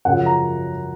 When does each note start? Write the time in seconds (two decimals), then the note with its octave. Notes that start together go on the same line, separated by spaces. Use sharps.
0.05 F#2 C#3 F3 F#5
0.26 A#5